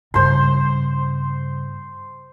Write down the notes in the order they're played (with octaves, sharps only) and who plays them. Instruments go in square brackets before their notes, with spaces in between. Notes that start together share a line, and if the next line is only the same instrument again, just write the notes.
[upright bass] G2 C#3 [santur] C5 C6